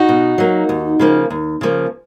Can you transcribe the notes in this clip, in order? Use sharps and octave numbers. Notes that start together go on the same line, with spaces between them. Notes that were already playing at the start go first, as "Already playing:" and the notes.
Already playing: D#4 F#4
B2
F#3 A#3
D#2
C#3 F3 A#3
D#2
C#3 F3 A#3